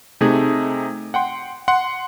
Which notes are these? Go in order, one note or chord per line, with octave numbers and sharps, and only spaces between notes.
C3 A3 D#4 G#4
F#5 G5 C6
F#5 C6